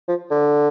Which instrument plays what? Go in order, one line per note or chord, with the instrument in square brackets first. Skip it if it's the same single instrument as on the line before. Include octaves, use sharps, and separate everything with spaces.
[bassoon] F3
D3